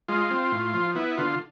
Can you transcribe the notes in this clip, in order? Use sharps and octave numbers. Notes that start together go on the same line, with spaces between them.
G#3 F4
C4
A2
F3
B3 E4
D3 F4